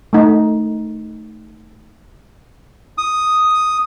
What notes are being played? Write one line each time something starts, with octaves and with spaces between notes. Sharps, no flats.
A3 D#4
D#6